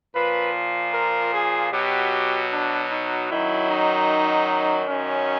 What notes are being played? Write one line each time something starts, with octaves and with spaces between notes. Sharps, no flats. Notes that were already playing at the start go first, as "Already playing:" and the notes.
A#2 F3 B4
A#4
G#4
B2 F#3 G4
D4
D#4
F#2 D#3 F#3 E4
D#4
F#2 D#3 F#3 C#4